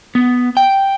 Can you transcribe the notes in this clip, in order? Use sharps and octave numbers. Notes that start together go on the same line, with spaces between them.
B3
G5